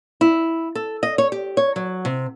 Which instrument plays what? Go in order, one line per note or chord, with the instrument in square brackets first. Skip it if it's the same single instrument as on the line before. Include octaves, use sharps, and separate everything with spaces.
[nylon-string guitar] E4
A4
D#5
C#5
G4
C#5
F#3
C3